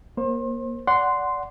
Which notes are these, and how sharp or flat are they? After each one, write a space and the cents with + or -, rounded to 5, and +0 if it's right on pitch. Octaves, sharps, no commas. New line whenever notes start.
A#3 +20 C5 +35
D5 -20 F#5 +0 C6 -10